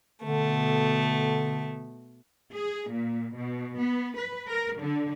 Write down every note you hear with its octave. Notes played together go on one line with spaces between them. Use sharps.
B2 D3 A3
G#4
A#2
B2
B3
B4
A#4
D3